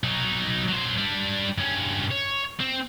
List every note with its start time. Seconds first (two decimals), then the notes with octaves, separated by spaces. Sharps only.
0.04 F#3 D#4
0.69 F#3 C5
0.98 G3 D4
1.58 G2 C#4
2.12 C#5
2.61 C4